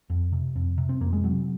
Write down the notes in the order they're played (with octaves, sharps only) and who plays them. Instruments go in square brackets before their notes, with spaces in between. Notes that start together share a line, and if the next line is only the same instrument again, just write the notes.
[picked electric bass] F2
C3
F2
C3
C4
F2 A#3
G#3
C3 F#3